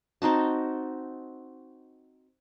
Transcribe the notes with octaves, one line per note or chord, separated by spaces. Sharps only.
C4 D#4 F#4 A5